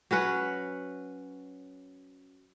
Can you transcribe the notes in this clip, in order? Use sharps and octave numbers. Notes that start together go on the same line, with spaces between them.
F#3 C#4 B4 F#5